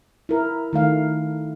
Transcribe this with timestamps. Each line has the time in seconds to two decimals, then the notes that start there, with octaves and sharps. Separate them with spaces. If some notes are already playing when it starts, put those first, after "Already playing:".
0.29 E4 A#4
0.73 D#3 A3 F5